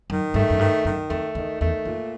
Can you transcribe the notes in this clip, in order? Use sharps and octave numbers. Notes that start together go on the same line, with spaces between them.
F#2 D#3
G2 A3
F#2
G2 D#3
F#2 D#3
F2 A3
E2 D#3
E2 A3
F2 A#2